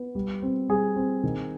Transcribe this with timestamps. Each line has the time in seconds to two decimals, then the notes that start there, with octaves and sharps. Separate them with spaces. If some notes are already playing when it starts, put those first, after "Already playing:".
Already playing: B3
0.15 G3
0.42 C4
0.69 G3 G#4
0.96 C4
1.23 D#3